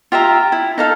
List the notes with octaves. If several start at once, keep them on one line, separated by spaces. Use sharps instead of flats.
F4 G4 E5 A#5
E4
D#4 A4 F5